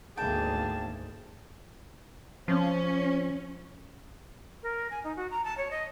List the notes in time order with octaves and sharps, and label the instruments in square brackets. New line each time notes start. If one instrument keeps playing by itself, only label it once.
[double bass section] G#1 D2 A#3 [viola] G#4 [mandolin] G5 [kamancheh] A5
[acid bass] F3 [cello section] C#4
[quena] A#4
G#5
D#4
F#4
A#5
A5
C#5
D#5